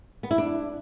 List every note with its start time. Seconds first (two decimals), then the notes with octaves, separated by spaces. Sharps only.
0.23 B3
0.31 E4
0.38 D4